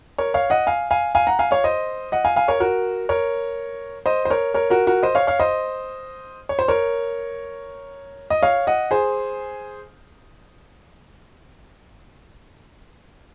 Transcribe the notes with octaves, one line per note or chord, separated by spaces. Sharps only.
A#4 C#5
C#5 F5
D#5 F#5
F5 G#5
F5 G#5
F5 G#5
F#5 A#5
F5 G#5
C#5 F5
C5 D#5
D#5 F#5
F5 G#5
F5 G#5
A#4 C#5
F#4 A#4
A#4 C#5
C5 D#5
C5
A#4 C#5
A#4 C#5
F#4 A#4
F#4 A#4
C5 D#5
C#5 F5
C#5 F5
C5 D#5
C#5
C5
A#4 C#5
D#5
C#5 F5
D#5 F#5
G#4 C5